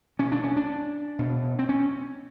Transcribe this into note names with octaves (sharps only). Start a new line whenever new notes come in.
B2 C#4
D4
C#4
D4
B2
C4
C#4